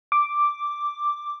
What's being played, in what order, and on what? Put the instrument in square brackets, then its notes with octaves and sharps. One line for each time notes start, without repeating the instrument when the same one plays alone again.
[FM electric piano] D6